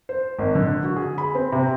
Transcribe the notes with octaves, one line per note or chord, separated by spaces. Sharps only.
C5
G#1
D3
F#4
G#4
B5
C4
C3